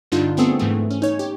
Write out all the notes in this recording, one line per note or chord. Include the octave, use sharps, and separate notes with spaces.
G2 D3 G3 D4 D#4 F4
A3 B3 C4 G#4 A4
G#2 E3 A3
C#4
D#4 C#5
G4